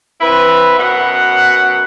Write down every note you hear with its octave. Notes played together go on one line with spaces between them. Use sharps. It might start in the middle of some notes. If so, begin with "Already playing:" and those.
C4 E4 B4
F#2 B2 F#5